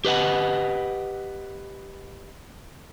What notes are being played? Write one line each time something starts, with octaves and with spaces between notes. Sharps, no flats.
G4 B4 D#5 F#5